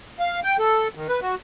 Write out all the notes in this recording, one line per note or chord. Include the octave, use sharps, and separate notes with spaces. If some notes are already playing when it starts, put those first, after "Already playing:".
F5
G5
A4
D#3
B4
F#4